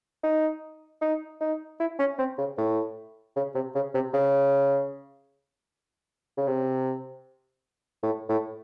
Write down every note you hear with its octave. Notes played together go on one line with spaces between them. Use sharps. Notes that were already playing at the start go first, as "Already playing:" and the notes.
D#4
D#4
D#4
E4
C#4
C4
C#3
A2
C#3
C3
C#3
C3
C#3
C#3
C3
A2
A2